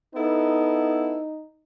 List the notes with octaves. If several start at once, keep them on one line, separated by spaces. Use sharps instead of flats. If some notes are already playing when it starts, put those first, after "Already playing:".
B3 D#4 E4 A4